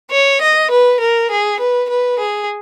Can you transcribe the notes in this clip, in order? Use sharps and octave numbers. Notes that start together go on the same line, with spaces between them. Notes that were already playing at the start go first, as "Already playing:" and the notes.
C#5
D#5
B4
A#4
G#4
B4
B4
G#4